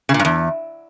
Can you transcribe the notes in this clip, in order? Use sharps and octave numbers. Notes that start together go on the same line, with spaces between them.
C#3
A#2
G2
E2